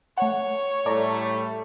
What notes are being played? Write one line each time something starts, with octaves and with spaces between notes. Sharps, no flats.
A3 C#5 F#5
A2 G3 A3 D5 A5 A#5